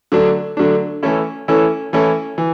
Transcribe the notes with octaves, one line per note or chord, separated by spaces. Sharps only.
D3 F#3 A3 D4
D3 F#3 A3 D4
E3 A3 C#4 E4 A4
E3 A3 C#4 E4 A4
E3 A3 C#4 E4 A4
E3